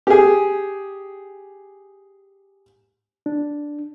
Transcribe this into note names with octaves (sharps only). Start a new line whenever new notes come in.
G4 G#4
D4